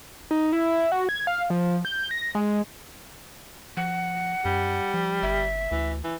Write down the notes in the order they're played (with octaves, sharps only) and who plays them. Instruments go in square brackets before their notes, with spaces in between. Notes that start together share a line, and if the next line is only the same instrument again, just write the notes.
[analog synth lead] D#4
E4
F#4
G#6
F5
F3
G6
A#6
G#3
[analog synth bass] F3 [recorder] F#5
[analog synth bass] F#2 [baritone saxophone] G3
[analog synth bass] F3
[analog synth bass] G1 [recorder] E5
[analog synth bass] D2 [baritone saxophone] E3
[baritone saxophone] E3